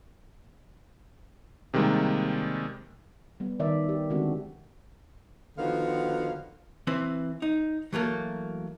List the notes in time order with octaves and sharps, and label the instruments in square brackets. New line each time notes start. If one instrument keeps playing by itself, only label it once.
[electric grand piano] C3 D#3 G3 G#3 A#3
[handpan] G3 B3
D#3 D5 E5
G4
D3 D#3 G#3 C4 D4 F#4
[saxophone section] D3 D#3 F3 B3 F#4 F5
[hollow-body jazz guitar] E3 C4 B4 C5
D#4
E3 F#3 A3 A#3